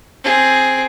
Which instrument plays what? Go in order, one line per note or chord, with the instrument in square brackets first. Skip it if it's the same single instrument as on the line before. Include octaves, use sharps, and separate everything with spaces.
[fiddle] C4 G#4